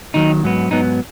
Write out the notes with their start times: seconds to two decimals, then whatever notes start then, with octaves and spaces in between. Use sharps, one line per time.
0.14 D#2 D#3 F#3 D#4
0.43 G#2 F#3 B3
0.71 G#2 F#3 B3 D#4